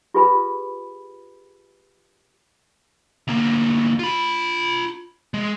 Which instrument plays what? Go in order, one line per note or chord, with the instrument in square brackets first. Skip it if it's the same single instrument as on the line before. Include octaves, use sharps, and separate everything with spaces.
[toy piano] F4 G4 G#4 B4 G#5 B5
[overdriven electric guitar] D2 A#3
F4 B5
G#3